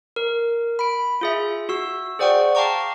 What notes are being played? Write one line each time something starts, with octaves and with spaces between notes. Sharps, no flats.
A#4
B5 D7
F4 G#4 E5
F#4 E6
G#4 C5 D5 F#5 G5 C#6
F5 G5 A5 A#5 C#6 D6